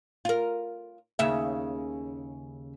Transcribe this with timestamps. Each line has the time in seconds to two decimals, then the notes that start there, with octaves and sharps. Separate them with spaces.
0.25 F4 A#4
1.19 D#2 C#3 E5